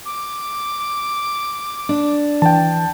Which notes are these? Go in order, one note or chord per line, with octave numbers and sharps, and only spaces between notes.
D6
D4
E3 G5 A5